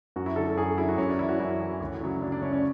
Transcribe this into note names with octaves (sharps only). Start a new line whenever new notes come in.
F#2 F#4
E4
D3 F#3 A4
A4
F#2 G#4
D3 F#3 E4
F#4
F#2 C#4
D4
E3 E4
F#4
F#2 E4
E3
D2
C#3 F#3
D2 D4
D4
C#3 F#3 C#4
C#4